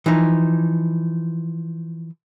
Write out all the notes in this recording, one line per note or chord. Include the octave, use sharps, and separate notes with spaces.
E3 F3 D#4